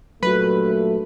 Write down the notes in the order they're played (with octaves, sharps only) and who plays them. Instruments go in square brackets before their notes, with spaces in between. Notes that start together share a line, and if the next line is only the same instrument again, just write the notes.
[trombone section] G2 A#2 A3 [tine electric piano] F#3 F#4 [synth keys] B4